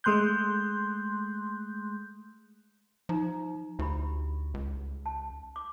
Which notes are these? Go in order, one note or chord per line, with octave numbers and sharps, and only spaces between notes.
G#3 A3 C6 F#6 G6
F3 D#4 A#5
D2 E4 G4 B5
C#2
A5
D6